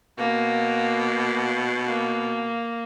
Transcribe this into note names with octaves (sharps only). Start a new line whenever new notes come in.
B2 A#3
A#3